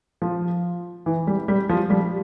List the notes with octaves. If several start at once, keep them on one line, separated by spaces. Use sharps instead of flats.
F3
E3
G3
G3
F3
G3